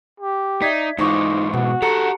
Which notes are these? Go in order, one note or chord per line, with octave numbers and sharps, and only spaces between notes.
G4
D#4 D5 E5 G#6 B6
G#2 E3 D#4 F4 C5 C#6 D6
B2 F#4
G4 A4 F#5 A#5 C#7